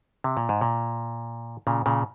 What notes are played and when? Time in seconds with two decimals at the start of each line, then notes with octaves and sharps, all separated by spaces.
0.24 C3
0.37 A#2
0.49 G#2
0.61 A#2
1.67 A#2 C#3
1.86 A#2 C#3